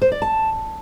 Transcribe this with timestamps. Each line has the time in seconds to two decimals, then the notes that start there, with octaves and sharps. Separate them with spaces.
0.02 C5
0.12 D5
0.22 A5